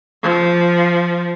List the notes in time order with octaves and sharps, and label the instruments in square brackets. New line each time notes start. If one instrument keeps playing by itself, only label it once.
[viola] F3